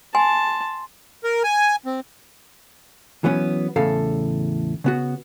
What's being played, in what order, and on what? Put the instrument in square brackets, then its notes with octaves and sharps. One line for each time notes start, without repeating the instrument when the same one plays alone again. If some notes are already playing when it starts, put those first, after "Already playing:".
[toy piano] G#5 [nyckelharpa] A5 [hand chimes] C6
[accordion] A#4
G#5
C4
[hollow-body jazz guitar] E3 F#3 B3 C#4
E2 A2 C#3 A4 F5
C#3 B3 F#4